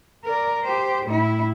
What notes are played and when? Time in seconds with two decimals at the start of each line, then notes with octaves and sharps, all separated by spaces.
0.25 A#4 D5
0.62 G4 C5
1.06 A2 E4